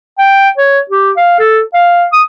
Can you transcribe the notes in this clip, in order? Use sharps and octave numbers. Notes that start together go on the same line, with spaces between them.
G5
C#5
G4
F5
A4
F5
D#6